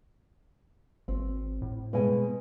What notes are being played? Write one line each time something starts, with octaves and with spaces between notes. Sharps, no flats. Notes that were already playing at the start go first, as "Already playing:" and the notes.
G#1 C4
A2
B2 G#3 G#5